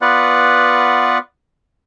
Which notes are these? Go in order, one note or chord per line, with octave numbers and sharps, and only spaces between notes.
B3 F4 B4 D5 F#5